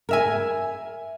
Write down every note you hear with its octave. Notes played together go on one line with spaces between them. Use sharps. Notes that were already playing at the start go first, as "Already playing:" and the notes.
A#4 E5 G#5